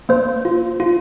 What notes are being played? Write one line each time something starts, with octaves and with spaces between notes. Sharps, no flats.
A#3 C5
F4
F4